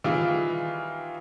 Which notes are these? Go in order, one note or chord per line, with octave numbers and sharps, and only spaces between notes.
D#3 E3 G3 F4 G#4